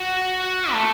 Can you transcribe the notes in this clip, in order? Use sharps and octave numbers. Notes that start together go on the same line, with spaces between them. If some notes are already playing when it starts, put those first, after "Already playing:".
Already playing: F#4
A3